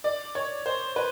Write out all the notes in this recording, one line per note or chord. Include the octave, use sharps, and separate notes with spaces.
D5
C#5
C5
B4